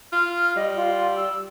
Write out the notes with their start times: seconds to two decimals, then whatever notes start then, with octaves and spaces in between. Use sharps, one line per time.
0.13 F4 F6
0.33 F6
0.56 G3 D#5
0.77 F4
1.16 E6